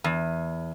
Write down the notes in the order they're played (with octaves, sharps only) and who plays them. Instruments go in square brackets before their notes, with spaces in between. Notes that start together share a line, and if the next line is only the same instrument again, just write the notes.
[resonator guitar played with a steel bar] E2